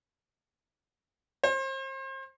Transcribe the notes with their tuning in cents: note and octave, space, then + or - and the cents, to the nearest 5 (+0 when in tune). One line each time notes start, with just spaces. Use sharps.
C5 +35